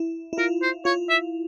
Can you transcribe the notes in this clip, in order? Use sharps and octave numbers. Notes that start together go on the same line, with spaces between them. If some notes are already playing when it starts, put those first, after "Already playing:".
Already playing: E4
E4
F4 A#4
C5
F4 C#5
E5